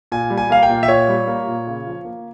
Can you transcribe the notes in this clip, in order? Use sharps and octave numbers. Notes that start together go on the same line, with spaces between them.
A#2 G#5
G3
G#5
A#3 F5
G5
A#2
E5
A#2 C#5
G3
A#3
A#2
C#3
F3
A#3